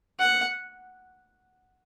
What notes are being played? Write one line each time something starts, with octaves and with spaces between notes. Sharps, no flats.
F#5